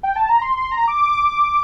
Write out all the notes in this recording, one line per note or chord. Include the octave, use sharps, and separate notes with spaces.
G5
A5
A#5
C6
C6
A#5
D6